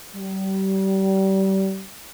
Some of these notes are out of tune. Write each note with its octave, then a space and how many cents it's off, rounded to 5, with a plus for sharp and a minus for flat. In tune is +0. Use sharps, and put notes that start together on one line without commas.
G3 -30